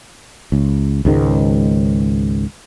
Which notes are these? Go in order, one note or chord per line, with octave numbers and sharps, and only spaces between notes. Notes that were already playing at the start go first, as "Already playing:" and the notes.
C#2
C#2 G#2 D#3